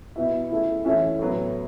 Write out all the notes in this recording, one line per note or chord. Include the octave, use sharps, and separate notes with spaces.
B2 B3 E4 E5
C#3 A3 E4
E3 A3 C#4 E4 E5
A2 F#3 B3